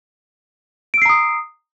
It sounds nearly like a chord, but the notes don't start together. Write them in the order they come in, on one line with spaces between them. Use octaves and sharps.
D7 E6 C7 A#5 D#6